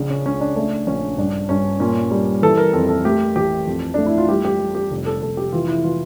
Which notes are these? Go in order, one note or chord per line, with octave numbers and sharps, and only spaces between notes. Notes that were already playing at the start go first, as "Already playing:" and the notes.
Already playing: A#1 C#3 D4
C#4
C#2 C#4
D4
A3 D4
A#1 C#4
G2 D4
G2 C#4
A#2 C#4
G3
E3 A4
A#4
F2 A4
A4
A3 G4
A1 G4
F2
A3 D4
E4
F4
G3 G4
G4
G3
G4
F1
A4
F1 A4
G4
E3 F4
E4
E3 F4